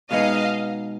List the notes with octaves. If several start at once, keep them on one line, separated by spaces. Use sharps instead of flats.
B2 G#3 B3 D#4 D#5 F5